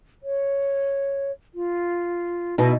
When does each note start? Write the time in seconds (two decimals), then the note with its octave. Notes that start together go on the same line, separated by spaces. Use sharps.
0.23 C#5
1.54 F4
2.58 B2 D#4 E4